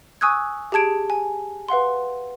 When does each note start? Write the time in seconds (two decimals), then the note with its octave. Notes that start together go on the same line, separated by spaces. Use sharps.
0.21 G#5 C#6 D#6 E6 F#6 G#6
0.72 G4 G#4 A5 G#6 D7
1.10 G#5
1.69 B4 F5 F#5 C6